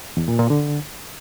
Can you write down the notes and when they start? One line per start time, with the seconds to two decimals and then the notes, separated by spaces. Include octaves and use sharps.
0.17 E2
0.28 A#2
0.39 A#2
0.50 D3